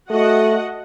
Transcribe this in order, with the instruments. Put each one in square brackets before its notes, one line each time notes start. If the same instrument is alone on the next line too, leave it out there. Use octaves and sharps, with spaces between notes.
[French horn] A3 [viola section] F#4 D#5 F#5